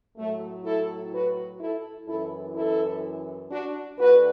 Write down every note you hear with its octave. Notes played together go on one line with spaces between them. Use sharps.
A2 F#3 A3
E4 A4
F#4 B4
E4 A4
F#2 E3 E4 A4
E4 A4
D4 F#4
D2 D3 F#4 B4